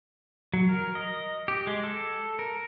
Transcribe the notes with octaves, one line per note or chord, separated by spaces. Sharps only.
F#3
A#4
D#5
G4
G#3
A4
A#4